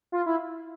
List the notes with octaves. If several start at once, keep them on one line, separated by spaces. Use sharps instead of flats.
F4
E4